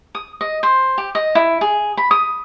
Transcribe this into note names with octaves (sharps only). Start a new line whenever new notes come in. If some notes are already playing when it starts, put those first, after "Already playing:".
D#6
D#5
C5
G4
D#5
E4
G#4
B5
D#6